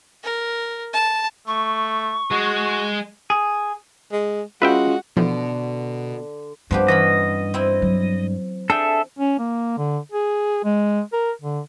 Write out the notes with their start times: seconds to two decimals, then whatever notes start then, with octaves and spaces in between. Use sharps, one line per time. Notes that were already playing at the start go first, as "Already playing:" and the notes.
0.23 A#4
0.93 A5
1.47 A3 C#6
2.31 G#3 F#4 G#4
3.30 G#4
4.12 G#3
4.62 G#3 C#4 F4 F#4 B4 E5 G5
5.17 B2 D3 E3 F3
6.71 G2 F3 B3 C4 G4
6.88 E3 C#4 D#5 B5
7.54 C4 E4
7.82 F#3
8.70 D4 G#4 A4 E5 G5
9.19 C#4
9.39 A#3
9.78 D3
10.12 G#4
10.64 G#3
11.13 A#4
11.42 D3